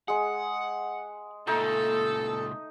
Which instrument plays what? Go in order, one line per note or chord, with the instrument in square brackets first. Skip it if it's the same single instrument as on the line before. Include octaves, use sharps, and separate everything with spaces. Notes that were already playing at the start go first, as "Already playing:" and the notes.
[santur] G#3 G#4 [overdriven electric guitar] F#5
[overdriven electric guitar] C#2 A#2 [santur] A3 [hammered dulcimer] D#4 [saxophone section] A4